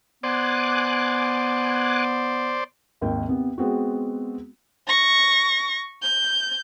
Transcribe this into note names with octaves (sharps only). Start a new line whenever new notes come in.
B3 C5 D5 G#5 D6 F#6
G#1 D#2 G5
C3 B3
G#3 B3 C4 F#4
C#6 A#6
G6